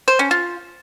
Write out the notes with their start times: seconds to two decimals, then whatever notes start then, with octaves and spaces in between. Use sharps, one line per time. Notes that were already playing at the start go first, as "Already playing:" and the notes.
0.08 C5
0.19 C#4
0.31 F4